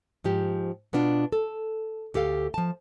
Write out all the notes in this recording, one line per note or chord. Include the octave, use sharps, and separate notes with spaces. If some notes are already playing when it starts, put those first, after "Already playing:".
G#2 F3 G4
B2 B3 D4 F4
A4
D2 G4 A4 F5
F3 A5